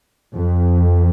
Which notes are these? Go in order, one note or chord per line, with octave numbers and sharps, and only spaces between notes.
F2